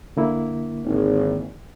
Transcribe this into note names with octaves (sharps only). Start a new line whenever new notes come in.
D3 A#3 E4
G#1